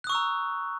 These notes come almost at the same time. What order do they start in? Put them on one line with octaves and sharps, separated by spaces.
F#6 D#6 C#6 E6 A#5